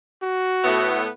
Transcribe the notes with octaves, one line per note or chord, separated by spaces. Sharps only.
F#4
A2 A3 B3